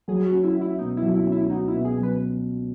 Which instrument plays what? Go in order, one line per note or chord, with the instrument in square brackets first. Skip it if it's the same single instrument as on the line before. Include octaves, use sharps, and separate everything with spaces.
[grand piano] F#3 [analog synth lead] G#4
[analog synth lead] F#4
[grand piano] C#4
[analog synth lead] E4
[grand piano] F#4
[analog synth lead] E4
[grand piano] B2 [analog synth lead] D#4
[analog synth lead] E4
[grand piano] F#3
[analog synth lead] E4
[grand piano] C#4
[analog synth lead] E4
[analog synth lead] D#4 [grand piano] F#4
[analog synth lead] E4
[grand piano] B2
[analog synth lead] G#4
[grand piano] F#3
[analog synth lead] B4